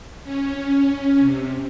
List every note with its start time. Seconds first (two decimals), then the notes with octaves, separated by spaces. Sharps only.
0.24 C#4
1.19 C3